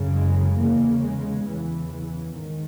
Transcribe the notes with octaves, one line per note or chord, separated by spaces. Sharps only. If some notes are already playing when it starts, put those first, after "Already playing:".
Already playing: F#2 C#3
G#3
E2 C#3 A#3
G#3
E2 C#3 E3
E3
G#2 D#3